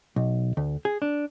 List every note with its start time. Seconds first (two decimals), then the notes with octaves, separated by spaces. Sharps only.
0.16 B1
0.57 D2
0.85 G#4
1.02 D4